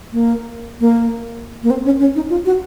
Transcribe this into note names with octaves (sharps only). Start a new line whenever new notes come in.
A#3
A#3
A#3
C4
C#4
C#4
D#4
F4
F#4